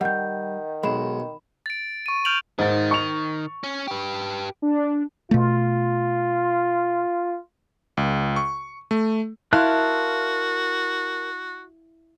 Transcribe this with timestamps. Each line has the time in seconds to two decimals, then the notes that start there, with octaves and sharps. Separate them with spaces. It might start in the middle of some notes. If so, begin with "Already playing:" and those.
0.01 D#3 G3 F#5 G6
0.83 B1 G#3 B5 E7
1.66 A6 D7
2.06 C#6 D#7
2.25 F6 G6 D7 F7 F#7
2.59 G#2 D#3 A6
2.91 C#6 F7
3.64 C#4
3.88 G4 B4
4.62 D4
5.31 B2 A3 F4
7.97 C#2
8.36 C#6
8.91 A3
9.53 E4 F#4 A#4 F5 A5 C6 F#6